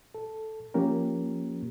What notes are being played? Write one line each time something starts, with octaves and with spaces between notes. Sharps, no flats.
A4
F3 A#3 C#4 G4 A#4